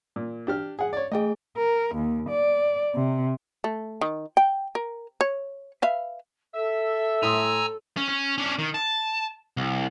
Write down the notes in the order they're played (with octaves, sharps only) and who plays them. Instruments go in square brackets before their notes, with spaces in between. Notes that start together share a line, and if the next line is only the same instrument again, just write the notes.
[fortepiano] A#2
D4 G4 F6
G#4 F#5
C#5 D5
[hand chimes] A3 G#4 [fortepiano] D#5 G5
[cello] A#4
D#2
D5
C3
[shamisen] A3
D#3
G5
A#4
C#5
B4 E5 F5
[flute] A4 [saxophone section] E5
[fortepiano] A2 C6 D#6 [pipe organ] G#5 A#5 E6
[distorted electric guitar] C#4
C#4
C#4 D4
D#3
A5
C2